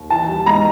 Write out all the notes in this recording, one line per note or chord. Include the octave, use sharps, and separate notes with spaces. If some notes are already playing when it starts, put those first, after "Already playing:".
Already playing: D#2
E3 A5
G3
G#2 A#5